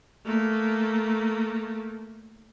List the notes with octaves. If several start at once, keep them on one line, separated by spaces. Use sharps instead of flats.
A3 A#3